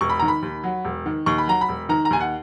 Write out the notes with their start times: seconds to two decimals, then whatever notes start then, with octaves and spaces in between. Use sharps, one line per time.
0.01 E1 C#6
0.10 B5
0.19 D#3 A#5
0.28 B5
0.42 D#2
0.64 F#3
0.85 E1
1.06 D#3
1.26 D#2 C#6
1.38 B5
1.47 F#3 A#5
1.61 B5
1.69 E1
1.89 D#3 A#5
2.05 A#5
2.10 D#2 G#5
2.20 F#5